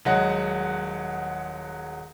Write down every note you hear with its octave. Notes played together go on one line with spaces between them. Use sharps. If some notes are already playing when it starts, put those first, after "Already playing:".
D#1 F#3 G#3 F#5